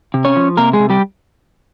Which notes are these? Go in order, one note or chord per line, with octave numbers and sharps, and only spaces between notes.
C3
C#4 C#5
F3
C3 A#3 A#4
G#3 G#4
C3
G3 G4